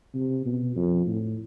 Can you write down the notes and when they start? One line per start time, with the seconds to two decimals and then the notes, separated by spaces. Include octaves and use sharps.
0.14 C3
0.45 B2
0.76 F2
1.07 A2